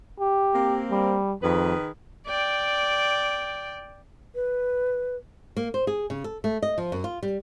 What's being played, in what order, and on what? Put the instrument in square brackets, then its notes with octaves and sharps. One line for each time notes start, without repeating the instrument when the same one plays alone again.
[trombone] G4
[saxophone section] A#3 C4
[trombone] G3
[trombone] F2 [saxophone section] D#3 G#4 B4
[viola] D5 G5
[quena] B4
[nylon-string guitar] A#3
C5
G#4
C#3
A4
A3
D#5
F3
F#2
F4
G3